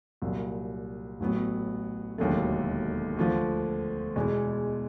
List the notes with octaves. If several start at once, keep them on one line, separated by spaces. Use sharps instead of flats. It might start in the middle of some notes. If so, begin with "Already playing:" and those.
C2 A#2 F#3
A1 A2 F#3 B3
E1 D#2 D3 F#3 A3
D2 D3 F3
E2 B2 G#3